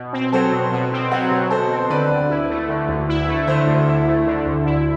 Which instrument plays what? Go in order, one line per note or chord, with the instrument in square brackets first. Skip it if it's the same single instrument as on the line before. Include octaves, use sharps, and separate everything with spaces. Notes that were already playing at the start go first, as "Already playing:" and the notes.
Already playing: [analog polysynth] B2
C4
[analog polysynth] F#3 [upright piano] A4 C5
[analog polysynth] B2
B2
C4
[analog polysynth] F#3 [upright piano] F#4
[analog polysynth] B2
[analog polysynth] B2 [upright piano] A4 C5
[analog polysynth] C4
[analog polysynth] D3 [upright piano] B4 D5
[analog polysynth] D2
E4
A3
D3
D2
E4
A3
[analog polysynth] D3 [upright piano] C5 E5
[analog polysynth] D2
E4
A3
D3
D2
E4